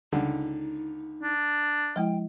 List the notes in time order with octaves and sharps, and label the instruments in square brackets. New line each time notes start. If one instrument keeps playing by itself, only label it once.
[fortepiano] C#2 D3 [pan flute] D#4
[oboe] D4
[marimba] F3 G#3 E4 [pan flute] G5